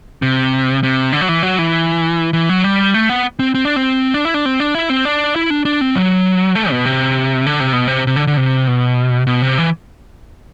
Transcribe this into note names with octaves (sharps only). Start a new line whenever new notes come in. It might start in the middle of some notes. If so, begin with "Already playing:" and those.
C3
C3
D3
F#3
E3
F#3
E3
E3
F#3
G3
A3
B3
C4
C4
D4
C4
D4
E4
D4
C4
D4
E4
C4
D4
E4
D4
D4
C4
F#3
A3
B2
C3
D3
C3
B2
C3
C3
D3
D3
C3
B2
B2
C3
E3